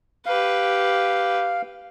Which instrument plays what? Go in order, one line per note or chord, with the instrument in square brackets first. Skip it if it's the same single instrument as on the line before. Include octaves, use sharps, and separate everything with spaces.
[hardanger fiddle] G4 B4 [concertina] F5